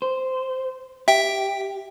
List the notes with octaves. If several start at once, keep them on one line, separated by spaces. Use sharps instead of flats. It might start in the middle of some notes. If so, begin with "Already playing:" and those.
C5
G4 E5 G5